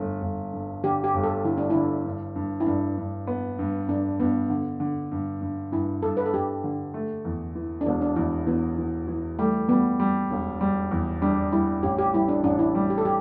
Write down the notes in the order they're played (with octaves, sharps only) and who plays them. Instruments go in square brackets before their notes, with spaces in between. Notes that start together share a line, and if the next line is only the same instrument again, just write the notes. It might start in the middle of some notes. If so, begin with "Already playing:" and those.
Already playing: [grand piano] G1 A3
G1
G2
[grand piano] D3 [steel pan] G4
[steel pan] G4
[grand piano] G1
[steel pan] A4
[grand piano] D3 [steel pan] E4
[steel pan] D4
[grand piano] D3 [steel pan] E4
[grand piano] G2
G2
[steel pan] E4
[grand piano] G2 [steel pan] D4
[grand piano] G2
B3
G2
[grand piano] G2 [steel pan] D4
[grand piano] G2 [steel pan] B3
[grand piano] D3
D3
G2
G2
[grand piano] G2 [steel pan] E4
[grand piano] G2 [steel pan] A4
[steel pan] B4
A4
[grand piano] G2 [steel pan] G4
[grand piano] D3
A3
E2
E3
[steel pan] D4
[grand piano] E1 [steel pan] B3
[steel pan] D4
[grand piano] E2 [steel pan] E4
[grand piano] E3 [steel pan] B3
[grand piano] E3
E3
[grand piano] G3 [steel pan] A3
[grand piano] G3 [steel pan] B3
[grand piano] G3
E1
G3
E2
[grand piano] G3 [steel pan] D4
[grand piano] G3 [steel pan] E4
[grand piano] A1 [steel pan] G4
[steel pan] G4
[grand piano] G3 [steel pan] E4
[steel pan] D4
[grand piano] A1 [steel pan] D4
[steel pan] E4
[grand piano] G3
[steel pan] G4
A4
G4